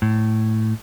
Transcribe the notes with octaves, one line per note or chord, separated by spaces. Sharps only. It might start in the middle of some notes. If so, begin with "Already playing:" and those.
A2